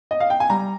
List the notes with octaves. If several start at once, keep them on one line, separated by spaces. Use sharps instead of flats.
D#5
F5
G5
G#5
G3 A#5